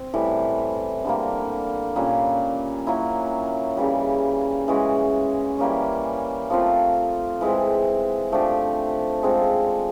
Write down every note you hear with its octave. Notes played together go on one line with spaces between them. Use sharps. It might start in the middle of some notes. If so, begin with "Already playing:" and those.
Already playing: C4
A2 E3 G3
D3 G3 A#3
A#2 G3 A#3 C#4
F#3 A#3 C#4 E4
C#3 E3 G3
E3 G#3 C#4 F#4
E3 G3 A#3 C#4
F3 A3 C4 F4
E3 G#3 C4
F3 A3 D4 G4
G#3 C4 F4 A4